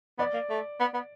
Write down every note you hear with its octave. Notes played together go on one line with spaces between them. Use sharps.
B3 D5
A#3
A3
B3
B3